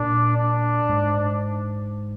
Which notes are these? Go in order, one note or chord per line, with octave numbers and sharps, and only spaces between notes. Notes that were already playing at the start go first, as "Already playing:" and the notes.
Already playing: A#2 D4
D4
G#2